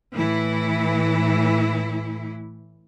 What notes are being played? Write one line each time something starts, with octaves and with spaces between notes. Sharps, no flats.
A2 E3 E4